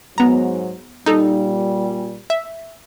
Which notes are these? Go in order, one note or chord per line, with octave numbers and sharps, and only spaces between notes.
G#2 F#3 B3 A#5
A#2 G3 D#4 A4
E5